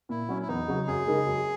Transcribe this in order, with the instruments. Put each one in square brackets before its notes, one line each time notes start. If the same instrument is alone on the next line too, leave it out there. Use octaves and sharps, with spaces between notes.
[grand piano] A#2 [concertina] E4
[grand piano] F#3 C#4
[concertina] E4
[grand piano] E2 [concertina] D#4
[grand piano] C#3 F#3
[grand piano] F#2 [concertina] G#4
[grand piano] C#3 G#3 D#4 A#4
F#2